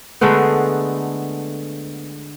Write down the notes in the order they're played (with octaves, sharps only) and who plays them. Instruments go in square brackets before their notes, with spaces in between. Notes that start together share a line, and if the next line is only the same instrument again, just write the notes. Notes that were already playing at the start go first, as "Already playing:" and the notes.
[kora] D3 G#3 A3 B3